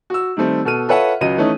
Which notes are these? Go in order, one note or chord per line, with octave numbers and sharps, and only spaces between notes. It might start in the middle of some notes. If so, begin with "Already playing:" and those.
F#4 E6
D#3 G3 A3 C4
B2 A4 F6 D#7
F4 A4 B4 C#5 E5 F#5
C#2 F#3 D#5 D#7
E3 A3 C#4 D#4